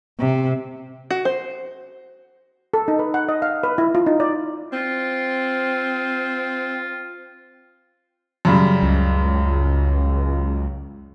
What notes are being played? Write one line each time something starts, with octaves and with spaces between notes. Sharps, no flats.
C3
F#4
C5
A4
D#4
B4
F#5
D#5
F5
B4
E4
F4
D#4
D5
C4 F4
F#2 C#3 G3
C#2